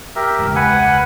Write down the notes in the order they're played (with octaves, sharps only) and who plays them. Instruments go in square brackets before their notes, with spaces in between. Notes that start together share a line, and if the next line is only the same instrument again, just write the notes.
[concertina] G4 A#4 E5
[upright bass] E1 C#2
[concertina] B4 F#5 G#5